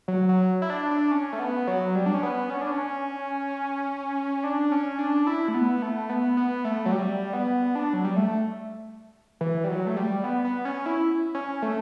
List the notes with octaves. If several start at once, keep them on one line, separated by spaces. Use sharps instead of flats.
F#3
F#3
E4
D4
D4
C#4
A3
B3
F#3
G3
D4
C#4
B3
C#4
D4
C#4
D4
C#4
D4
E4
A3
B3
A3
B3
B3
A3
F#3
G3
B3
D4
F#3
G3
A3
E3
G3
F#3
A3
G3
B3
B3
C#4
E4
C#4
A3